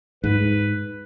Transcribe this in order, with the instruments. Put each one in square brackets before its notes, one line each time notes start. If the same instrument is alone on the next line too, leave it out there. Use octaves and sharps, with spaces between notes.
[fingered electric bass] G#2 [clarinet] B4